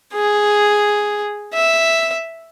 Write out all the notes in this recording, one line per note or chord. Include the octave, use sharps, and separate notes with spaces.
G#4
E5